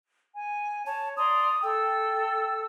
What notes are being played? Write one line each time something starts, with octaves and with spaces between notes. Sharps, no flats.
G#5
C#5 A5
D5 A#5 C6 D#6
A4 G5 E6